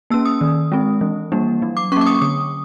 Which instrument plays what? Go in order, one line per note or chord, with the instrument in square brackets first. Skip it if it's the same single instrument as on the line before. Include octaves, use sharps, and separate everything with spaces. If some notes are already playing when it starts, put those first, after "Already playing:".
[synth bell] A#3 C#4 E6
D#6
D#3
G#3 C4
E3
G3 A#3 D4
F#3
D6
C#4 C#6
A#3 D6
D#6
D3 D#6